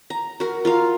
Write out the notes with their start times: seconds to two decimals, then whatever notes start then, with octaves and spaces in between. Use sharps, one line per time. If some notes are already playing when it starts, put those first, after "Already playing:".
0.10 A#5
0.40 F#4 A#4
0.65 F4 A#4 F5